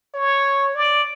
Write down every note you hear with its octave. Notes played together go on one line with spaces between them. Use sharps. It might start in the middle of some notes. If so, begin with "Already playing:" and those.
C#5
D5